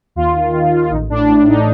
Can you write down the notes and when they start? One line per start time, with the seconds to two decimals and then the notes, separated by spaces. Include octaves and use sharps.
0.16 D#2 F4
0.35 D#3
0.53 D#3
0.72 D#3
0.90 A1 D#4
1.09 A2 D4
1.29 A2
1.47 A1 D#4